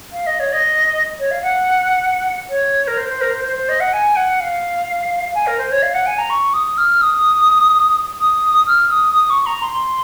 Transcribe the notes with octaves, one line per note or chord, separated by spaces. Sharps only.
F5
D#5
C#5
D#5
C#5
F5
F#5
C#5
A#4
C5
C5
A#4
C5
C5
C5
D#5
F#5
G#5
F#5
F5
G#5
A#4
C5
C#5
F5
F#5
G#5
A#5
C#6
D#6
F6
D#6
D#6
F6
D#6
D#6
C#6
A#5
C6